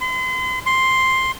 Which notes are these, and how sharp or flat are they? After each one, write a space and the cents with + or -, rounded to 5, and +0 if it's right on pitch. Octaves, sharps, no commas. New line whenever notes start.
C6 -40
C6 +5